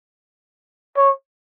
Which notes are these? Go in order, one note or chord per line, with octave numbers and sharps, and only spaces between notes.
C#5